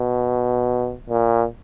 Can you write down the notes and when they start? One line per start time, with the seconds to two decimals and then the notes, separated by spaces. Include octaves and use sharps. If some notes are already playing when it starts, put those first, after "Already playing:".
Already playing: B2
1.10 A#2